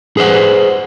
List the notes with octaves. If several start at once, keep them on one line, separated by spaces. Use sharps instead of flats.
G#4 B4 C5 E5 F#5